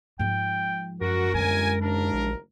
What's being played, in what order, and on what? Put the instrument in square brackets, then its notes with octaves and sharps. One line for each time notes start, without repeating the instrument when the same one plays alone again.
[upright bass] G#2 F3 [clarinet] G5
[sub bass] F#2 [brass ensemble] F#4 [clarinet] A#4
[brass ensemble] G1 G#5 [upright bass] D3 G#3
[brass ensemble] F#1 D#2 A#4 [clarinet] D4
[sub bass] A#1